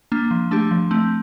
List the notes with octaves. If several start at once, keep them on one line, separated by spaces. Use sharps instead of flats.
A#3 D4
F3
A3 D4 G4
F3
A3 C4